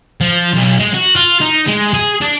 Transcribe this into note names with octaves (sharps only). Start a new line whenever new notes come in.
F3
B1
G#3
F#4
F4
D#4
G#3
G#4
D4